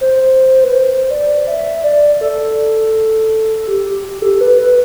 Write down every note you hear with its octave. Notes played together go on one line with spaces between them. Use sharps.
C5
B4
C5
D5
E5
D5
A4
G4
G4
G4
A4
B4
B4